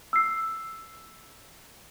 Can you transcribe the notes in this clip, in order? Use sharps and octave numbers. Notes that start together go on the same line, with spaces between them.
E6 C7